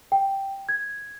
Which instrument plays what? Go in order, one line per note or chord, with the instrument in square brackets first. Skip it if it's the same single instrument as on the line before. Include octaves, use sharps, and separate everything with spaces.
[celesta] G5
G#6